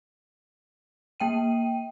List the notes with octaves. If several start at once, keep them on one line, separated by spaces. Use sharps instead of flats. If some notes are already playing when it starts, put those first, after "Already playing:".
A#3 G5 D#7